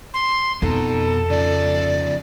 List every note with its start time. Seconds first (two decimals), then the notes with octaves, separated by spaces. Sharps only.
0.14 C6
0.62 F2 B2 D#4 A4
1.30 C#3 F3 D5